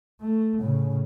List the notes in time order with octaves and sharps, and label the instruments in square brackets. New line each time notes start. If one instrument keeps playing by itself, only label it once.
[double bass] A3
A2 C#3